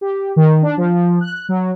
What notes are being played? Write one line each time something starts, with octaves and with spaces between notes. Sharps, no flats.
G4
D#3
D4
F3
F#6
F#3